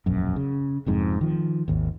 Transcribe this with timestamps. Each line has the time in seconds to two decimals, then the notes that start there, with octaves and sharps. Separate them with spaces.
0.06 E1 A#1 F#2
0.36 C#3
0.86 F1 F2 G#2
1.21 D#3 F3
1.68 G#1 D#2